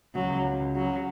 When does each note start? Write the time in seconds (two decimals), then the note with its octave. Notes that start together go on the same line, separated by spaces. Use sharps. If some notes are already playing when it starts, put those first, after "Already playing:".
0.15 C#2 F#3
0.30 C#2
0.44 C#2
0.60 C#2
0.75 C#3 F#3